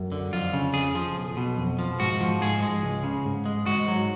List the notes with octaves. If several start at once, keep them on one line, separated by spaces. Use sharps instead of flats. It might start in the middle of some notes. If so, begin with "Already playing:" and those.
Already playing: F#2
D3
F2 F4
C#3
F2 G#4
F3
B1
B2
F2
F3
G#2 F#4
F3
G#2 G#4
G#3
C#2
C#3
G#2
G#3
G#2 F#4
F#3